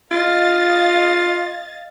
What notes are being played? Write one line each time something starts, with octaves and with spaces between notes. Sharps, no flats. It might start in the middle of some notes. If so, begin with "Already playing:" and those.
F4 D#5 F5 A6